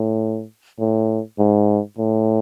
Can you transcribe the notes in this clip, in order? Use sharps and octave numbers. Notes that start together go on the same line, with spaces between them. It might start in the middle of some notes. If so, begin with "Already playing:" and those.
Already playing: A2
A2
G#2
A2